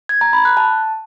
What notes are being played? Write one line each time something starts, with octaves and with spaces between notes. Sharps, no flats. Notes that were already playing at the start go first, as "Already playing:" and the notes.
G#6
A#5
B5
F#6
A5